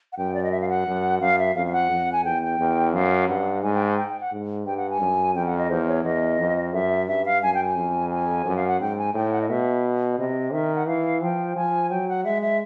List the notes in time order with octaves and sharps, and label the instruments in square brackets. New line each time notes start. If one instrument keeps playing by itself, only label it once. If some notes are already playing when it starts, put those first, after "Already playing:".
[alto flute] F#5
[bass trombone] F#2 [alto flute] G5
[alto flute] D5
D#5
E5
F5
F#5
[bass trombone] F#2
[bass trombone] F#2 [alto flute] F5
[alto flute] E5
[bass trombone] F2 [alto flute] F5
[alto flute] F5
F#5
[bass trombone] F2
[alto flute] G#5
[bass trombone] E2 [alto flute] G5
[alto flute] G5
[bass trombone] E2
[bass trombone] F#2 [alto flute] F5
[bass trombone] G2 [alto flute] F#5
[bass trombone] G#2 [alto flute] G#5
[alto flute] G5
G#5
G5
G5
F#5
[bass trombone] G#2
[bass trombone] G2 [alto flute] G5
[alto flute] F#5
G#5
[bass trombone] F#2
[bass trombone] F2 [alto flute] G5
[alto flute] F#5
D#5
[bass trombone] E2 [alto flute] C5
[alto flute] C#5
[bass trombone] E2 [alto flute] D#5
[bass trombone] F2
[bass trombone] F#2 [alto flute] E5
[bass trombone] G2 [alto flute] E5
[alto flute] F5
[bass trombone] F#2 [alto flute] G#5
[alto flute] G5
G#5
[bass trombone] F2
[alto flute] G#5
[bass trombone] F#2
[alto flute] F5
F#5
[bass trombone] G#2 [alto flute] G5
[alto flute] G#5
[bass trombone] A2 [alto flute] G5
[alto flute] F#5
D#5
[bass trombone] B2 [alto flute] E5
[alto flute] D5
[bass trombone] C3 [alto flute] D#5
[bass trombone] D#3 [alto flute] E5
[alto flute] F#5
[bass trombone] E3 [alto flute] F5
[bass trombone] F3 [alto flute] G5
[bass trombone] F3 [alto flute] G#5
[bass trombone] F#3 [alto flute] G5
[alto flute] F#5
[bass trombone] G#3 [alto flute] E5
[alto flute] E5